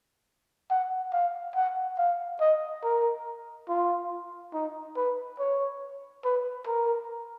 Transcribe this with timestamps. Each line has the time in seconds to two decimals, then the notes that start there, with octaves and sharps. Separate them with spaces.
0.70 F#5
1.13 F5
1.56 F#5
1.98 F5
2.41 D#5
2.84 A#4
3.69 F4
4.54 D#4
4.97 B4
5.40 C#5
6.25 B4
6.67 A#4